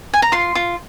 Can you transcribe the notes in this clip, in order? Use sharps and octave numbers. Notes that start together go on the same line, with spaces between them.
G#5
A#5
F4 C6
F4